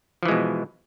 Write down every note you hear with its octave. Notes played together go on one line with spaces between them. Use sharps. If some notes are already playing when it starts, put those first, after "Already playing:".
B2 E3 F3 G#3